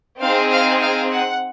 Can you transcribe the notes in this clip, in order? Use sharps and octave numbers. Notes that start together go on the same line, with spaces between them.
C4 D#4 G#4 F5
F5
F5
F#5